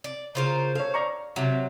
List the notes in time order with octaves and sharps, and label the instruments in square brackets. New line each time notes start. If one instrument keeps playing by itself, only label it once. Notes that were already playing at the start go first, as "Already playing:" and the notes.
[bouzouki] D5
[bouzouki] C#3 F4 A#4 [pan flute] C5
[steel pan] A4 C#5 [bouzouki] F5
[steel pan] D5 A#5 C#6
[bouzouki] C3 F#3 [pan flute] E5